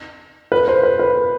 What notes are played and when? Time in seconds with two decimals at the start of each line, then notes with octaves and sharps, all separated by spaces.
0.52 B4
0.68 C5
0.83 B4
0.99 B4